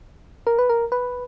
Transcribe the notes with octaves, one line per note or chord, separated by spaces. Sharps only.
A#4
B4
A#4
B4